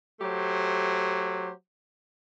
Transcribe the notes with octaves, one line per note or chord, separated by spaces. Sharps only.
F#3 A3 G4 C5